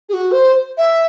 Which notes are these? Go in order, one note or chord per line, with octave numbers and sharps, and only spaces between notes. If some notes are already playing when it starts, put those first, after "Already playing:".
G#4
F#4
C5
E5